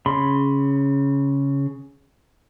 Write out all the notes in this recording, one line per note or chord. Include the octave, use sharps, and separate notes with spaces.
C#3 B5 C6